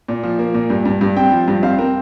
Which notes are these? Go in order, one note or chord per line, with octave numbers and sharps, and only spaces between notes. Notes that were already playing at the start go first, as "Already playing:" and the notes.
A#2
F3
A#3
A#2
G2
G2
G2
C4 G5
F3
G2
C4 F5
C4 A#4